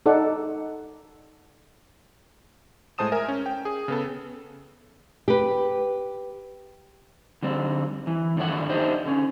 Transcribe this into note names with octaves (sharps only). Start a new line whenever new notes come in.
D#4 A4 D5 F#5
A2 G#3 C5 A5 D#6 E7
A#4 E5 G#5
C#4
G5
G#4
C#3 B3 A4
G4 B4
D3 G3 C4
E3
G2 D3 D#3 C#5 E5 F#5
D4 D#4 G4 C5 D#5 E5
D3 C#4